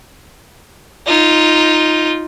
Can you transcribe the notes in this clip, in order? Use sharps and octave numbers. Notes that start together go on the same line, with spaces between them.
D#4 F4